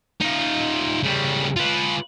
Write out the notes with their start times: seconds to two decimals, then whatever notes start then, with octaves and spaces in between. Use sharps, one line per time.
0.20 D#4 F4
1.03 C#3 G3
1.56 F4 B4